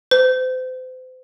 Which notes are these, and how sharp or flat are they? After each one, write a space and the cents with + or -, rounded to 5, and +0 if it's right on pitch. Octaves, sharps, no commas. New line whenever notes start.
C5 -35